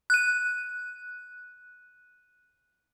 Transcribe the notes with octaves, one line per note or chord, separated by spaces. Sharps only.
F#6 D#7